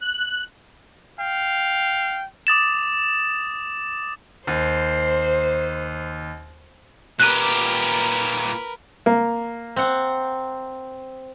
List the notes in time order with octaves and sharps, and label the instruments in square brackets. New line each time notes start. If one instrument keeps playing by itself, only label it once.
[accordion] F#6
[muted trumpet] F5 [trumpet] G5
[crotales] D6 D#6 A6 E7
[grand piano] D#2 [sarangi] C5
[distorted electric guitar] A#2 G4 [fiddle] A#4 B4 [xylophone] F#6 D#7
[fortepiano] A#3
[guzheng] C4 F#5